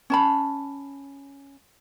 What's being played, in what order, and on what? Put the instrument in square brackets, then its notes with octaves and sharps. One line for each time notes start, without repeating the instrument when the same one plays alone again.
[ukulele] C#4 A5 B5